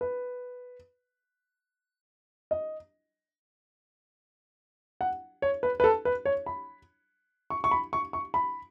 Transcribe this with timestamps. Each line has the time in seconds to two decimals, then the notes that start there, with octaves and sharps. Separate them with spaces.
0.01 B4
2.51 D#5
5.01 F#5
5.42 C#5
5.63 B4
5.80 B4
5.84 A4
6.05 B4
6.25 C#5
6.46 B5
7.50 C#6
7.64 C#6
7.71 B5
7.93 C#6
8.13 C#6
8.34 B5